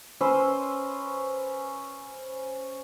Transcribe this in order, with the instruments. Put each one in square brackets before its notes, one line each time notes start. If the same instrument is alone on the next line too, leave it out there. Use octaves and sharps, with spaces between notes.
[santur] C#4 B4 C5 E6